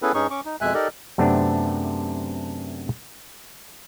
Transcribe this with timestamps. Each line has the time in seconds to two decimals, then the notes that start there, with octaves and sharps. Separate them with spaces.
0.02 B3 C#4 E4 G#4 A4 B4
0.14 G2 C#4 D#4 G#4 C#6
0.30 C#4 C#6 D6
0.45 D#4
0.61 F2 B2 G#3 E5 G#5 F#6
0.74 D#4 G4 A4 A#4 D5 D#5
1.18 F#2 C3 A3 B3 C4 D4